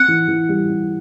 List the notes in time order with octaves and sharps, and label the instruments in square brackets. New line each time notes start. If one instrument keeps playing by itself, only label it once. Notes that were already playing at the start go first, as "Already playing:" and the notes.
Already playing: [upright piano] C4 [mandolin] F#5
[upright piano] E3
E3
G3
G3